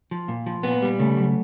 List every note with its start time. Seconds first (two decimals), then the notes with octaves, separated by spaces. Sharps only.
0.11 F3
0.28 A#2
0.46 F3
0.63 A#2 B3
0.82 G3
0.99 C#3 A3
1.17 F#3